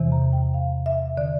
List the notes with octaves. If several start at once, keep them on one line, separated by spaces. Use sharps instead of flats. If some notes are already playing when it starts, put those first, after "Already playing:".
Already playing: E2 C3 E3
A#5
G5
F5
E5
D3 D5